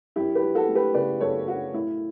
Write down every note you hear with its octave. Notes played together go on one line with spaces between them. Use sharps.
F#2 E4 G4
G4 B4
F#3
F#4 A4
A3
G4 B4
C#3 B4 D5
F#2 A4 C#5
F#3 F#4
A2 E4